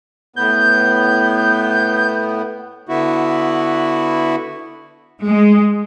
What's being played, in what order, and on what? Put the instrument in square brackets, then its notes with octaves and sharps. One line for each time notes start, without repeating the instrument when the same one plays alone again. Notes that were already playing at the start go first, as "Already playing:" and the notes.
[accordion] A2 B3 [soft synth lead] G6
[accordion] D3 B3 E4 F#4
[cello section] G#3